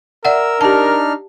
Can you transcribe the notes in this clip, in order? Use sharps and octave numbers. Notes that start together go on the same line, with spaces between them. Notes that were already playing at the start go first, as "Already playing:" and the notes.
A#4 D5 E5 F#5 E6
D4 D#4 G4 A5 F6